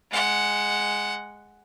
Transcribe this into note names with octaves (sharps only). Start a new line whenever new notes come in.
G#3 F#5